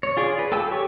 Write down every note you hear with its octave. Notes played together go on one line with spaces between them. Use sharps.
C#5
F4 G#4 D5
B4
A4 G5 G#5 E6
G4 C#5 C#6